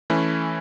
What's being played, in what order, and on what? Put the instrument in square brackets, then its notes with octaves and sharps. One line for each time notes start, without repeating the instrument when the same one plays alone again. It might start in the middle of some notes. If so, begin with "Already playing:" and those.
[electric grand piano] E3 A3 C#4 E4